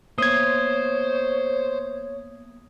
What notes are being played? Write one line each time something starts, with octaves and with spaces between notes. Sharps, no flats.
A#3 B3 C5 C#5 D#6 G#6